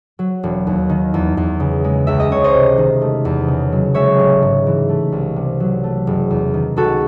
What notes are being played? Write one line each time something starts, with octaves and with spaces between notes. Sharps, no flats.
F#3
E1
D#2
D#3
E2
E2
C#3
G#3
C#2 E5
D#5
C#2 C#5
C5 D#5
C3
D#3
A3
E2
C#3
F#3
G#3 C#5 E5
A1
G#2
E3
A3
C2
C3
F#3
A3
F#1
E2
D#3
C#2 F#4 A4